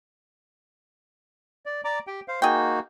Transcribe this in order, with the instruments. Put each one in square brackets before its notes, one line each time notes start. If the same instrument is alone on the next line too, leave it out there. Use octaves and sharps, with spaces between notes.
[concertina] D5
D5 A#5 D6
G4 G5
C5 F5
[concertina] A#3 D#4 F#4 [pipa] G#4 G5